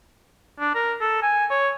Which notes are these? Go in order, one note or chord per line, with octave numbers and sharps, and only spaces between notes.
D4
A#4
A4
G#5
C#5